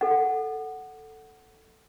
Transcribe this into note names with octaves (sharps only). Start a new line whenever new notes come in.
A4 F#5